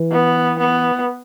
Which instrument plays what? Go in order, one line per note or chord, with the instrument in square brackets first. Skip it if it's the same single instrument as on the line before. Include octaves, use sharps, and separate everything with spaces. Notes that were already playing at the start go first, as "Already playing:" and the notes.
Already playing: [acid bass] E3
[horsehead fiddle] B3
B3